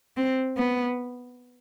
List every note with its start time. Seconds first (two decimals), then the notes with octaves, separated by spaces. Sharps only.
0.17 C4
0.57 B3